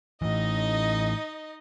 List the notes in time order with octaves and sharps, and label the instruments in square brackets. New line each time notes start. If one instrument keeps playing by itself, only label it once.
[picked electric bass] A2 E3 [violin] D#4 D#5